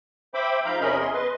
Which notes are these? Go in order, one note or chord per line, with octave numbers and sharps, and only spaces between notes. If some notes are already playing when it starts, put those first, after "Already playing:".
C5 E5 G5 B5 D6
G#2 F3 F5 A#5 B5 G6
E2 C3 C#4 A#4 D#5 B5
E2 G#4 C6
B4 D#5 C6